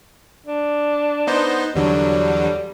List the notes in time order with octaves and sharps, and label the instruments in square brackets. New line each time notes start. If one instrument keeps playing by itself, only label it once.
[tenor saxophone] D4
[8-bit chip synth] B3 D#4 C5
[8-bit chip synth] E2 D3 F#3 [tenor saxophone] G3